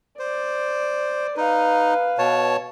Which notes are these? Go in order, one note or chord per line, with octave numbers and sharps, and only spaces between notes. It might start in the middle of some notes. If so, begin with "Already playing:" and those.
C5 D5
D#4 B4 F5
B2 C#5 A5